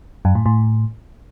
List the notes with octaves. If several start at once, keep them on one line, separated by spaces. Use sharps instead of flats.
F#2
A2
A2